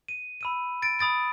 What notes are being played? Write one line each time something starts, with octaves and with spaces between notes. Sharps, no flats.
D#7
B5 E6 D#7
A6 D7
B5 D#6 A6 D7